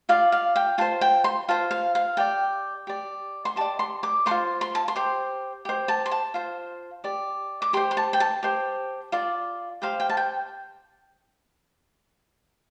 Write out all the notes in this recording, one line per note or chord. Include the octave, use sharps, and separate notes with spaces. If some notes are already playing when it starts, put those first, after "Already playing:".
F4 D5 F5
F5
G5
F4 C5 A5
G5
C6
F4 C5 A5
F5
F5
G4 D5 G5
G4 D5
C6
G4 D5 A5
C6
D6
A4 C5 C6
F4
C6
A5
C6
G4 C5
G4 C5
A5
C6
A5
F4 C5
G4 D5
D6
G4 C5 C6
C6
A5
G5
A5
G4 C5
F4 D5
G4 C5 F5
G5
A5
G5